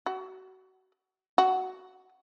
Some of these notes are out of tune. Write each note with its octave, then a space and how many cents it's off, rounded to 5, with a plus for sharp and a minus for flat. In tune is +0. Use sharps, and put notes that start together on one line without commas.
F#4 +30
F#4 +10